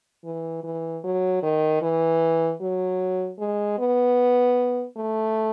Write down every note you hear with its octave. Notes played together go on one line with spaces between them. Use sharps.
E3
E3
F#3
D#3
E3
F#3
G#3
B3
A3